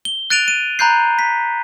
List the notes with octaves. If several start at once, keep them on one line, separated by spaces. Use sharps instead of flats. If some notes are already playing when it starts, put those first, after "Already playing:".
G7
F#6 A6 D7 D#7 F7
D#7
A#5 B5 F#6 G6 C7
B6